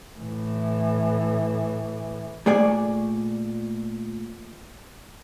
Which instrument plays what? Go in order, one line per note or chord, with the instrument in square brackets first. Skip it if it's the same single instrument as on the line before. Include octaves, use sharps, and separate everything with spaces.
[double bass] A2 E3
[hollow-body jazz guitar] A#2 A3 G#4 D5 G#5